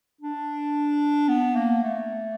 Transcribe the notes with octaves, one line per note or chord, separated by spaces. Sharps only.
D4
B3
A#3
A3